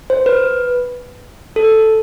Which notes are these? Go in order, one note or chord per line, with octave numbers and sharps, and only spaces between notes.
C5
B4
A4